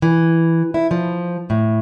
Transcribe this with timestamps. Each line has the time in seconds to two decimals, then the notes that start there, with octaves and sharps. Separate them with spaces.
0.02 E3
0.74 E4
0.91 F3
1.50 A2